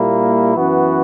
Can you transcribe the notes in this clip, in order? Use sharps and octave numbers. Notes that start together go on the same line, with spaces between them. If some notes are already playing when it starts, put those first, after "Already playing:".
Already playing: A#2 G3 A#3 E4
F#2 E3 B3 F#4